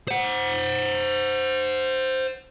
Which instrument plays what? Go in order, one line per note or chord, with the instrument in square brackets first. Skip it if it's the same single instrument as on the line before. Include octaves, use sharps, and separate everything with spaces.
[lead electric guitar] C5 F#5